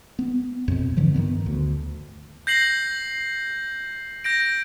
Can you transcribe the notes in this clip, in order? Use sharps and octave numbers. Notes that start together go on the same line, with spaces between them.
B3
F2 B2
G#2 D3 E3 F3
G2 D#3 B3
D2
G6 A#6 C7 F#7
G6 A#6 D7